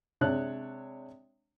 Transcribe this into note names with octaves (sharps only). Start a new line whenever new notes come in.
C3 G#3 D4 C#5 A5 F#6